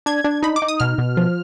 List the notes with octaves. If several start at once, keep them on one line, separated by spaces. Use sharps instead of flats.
D4 G#6
D4
D#4 B5
D6
D#4
D#6
B2 F6
B2
F3